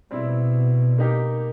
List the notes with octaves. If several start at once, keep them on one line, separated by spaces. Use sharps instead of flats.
B2 G3 C4 E4
A#3 D#4 G4 A#4